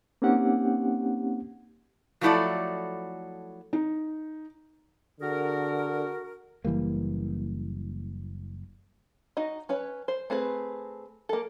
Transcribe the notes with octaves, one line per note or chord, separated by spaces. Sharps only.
A#3 C4 C#4 D#4 G4 F#5
F3 F#3 A3 E4 A4 D5
D#4
D3 F#4 G#4 A#4
F#1 E3 G3 A#3
D#4 F#4 D#5
C#4 B4 C#5
C5
A3 C4 G#4 B4
A#3 A4